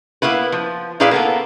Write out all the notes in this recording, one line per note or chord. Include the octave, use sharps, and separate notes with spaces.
A#3 B3 E4 B4
F3
A#2 E4 G#4 B4 D5 F5
A#3 B3 A4